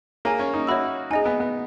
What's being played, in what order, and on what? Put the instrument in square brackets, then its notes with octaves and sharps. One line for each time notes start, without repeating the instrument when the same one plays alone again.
[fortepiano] A#3 [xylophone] G#4 C#5 G#5
[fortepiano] C#4
D#4
[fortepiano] F#4 [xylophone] C#5 E5 B5 E6
[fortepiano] D#4 [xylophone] G#4 D#5 G#5
[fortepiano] B3
B3